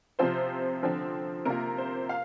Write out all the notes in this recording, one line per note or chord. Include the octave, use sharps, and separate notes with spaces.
C3 F3 C4 F4 C5
D3 F3 C4
C3 A#3 F4 A#4
C5
F5